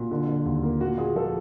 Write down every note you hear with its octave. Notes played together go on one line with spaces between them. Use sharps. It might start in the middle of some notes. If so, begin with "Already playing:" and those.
Already playing: A#2 F#4
D3
D3
D#2
A#3
A#2 F#4
A#2 G#4
F3 A4